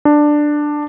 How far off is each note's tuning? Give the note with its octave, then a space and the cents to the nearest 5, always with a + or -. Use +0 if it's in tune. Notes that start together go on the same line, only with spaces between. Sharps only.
D4 +10